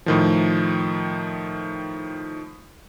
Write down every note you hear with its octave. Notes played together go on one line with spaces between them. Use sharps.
A2 D#3 F3